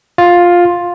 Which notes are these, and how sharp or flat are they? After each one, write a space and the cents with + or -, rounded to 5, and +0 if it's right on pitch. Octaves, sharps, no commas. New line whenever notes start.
F4 +10